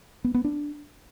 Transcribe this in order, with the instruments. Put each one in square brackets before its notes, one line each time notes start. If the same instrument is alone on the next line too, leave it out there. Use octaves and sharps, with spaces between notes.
[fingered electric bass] B3
B3
D4